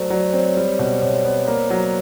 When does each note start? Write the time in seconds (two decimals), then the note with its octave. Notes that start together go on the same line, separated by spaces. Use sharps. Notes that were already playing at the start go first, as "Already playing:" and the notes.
Already playing: F#3 A3 C5 D5
0.10 F#3 D5
0.33 C4 C#5
0.56 G3 C5
0.79 B2
1.02 B2 C#5
1.25 B3
1.47 A#3
1.70 F#3